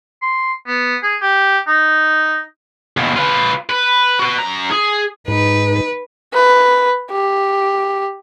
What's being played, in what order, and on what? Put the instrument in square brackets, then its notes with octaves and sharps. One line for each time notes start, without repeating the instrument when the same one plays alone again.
[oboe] C6
B3
G#4
G4
D#4
[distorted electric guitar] D#2 B2
F4 B4
B4
F#4 B4
F#2 A#5
G#4
[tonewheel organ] G#2 [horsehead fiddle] D#4 [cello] B4
[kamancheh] B4
G4